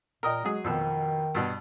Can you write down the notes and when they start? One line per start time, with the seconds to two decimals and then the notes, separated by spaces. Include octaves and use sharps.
0.23 A#2 A#4 D#5 G5
0.45 F#3 G#3 G#4
0.64 F2 B2 D#3 E6
1.35 G2 B2